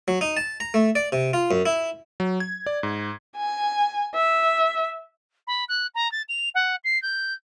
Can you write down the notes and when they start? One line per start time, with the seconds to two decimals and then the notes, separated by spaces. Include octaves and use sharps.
0.08 F#3
0.21 D#4
0.37 A5
0.60 A#5
0.74 A3
0.95 D5
1.12 C3
1.33 F4
1.51 F#2
1.66 E4
2.20 F#3
2.40 G#6
2.66 D5
2.83 G#2
3.36 G#5
4.15 E5
5.47 B5
5.68 F#6
5.94 A#5
6.11 A6
6.28 F7
6.54 F#5
6.84 C7
7.02 G6